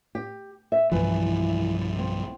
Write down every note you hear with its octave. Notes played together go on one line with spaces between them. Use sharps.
G4
E5
B1 G2 E3 F3
C4